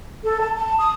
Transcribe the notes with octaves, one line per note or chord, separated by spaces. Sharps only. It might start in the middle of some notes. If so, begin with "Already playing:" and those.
A4
A5
A5
D#6